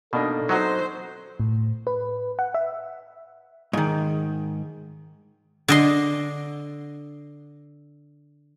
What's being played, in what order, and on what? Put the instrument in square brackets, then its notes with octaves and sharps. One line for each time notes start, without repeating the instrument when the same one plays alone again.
[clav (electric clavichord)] B2 [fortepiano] A#3 D4 D#4 [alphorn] A4
[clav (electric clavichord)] F#3 [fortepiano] C4 D#4 F#4 [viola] C5
[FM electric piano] A2
B4
F#5
E5
[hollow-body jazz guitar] G#2 D#3
[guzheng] D3 D#5 C6